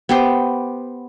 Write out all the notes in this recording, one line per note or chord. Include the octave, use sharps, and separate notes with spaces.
B3 G4 C5